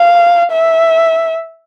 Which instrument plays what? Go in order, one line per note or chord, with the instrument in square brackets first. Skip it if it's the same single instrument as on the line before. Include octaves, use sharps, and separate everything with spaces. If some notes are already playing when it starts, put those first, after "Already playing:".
Already playing: [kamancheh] F5
E5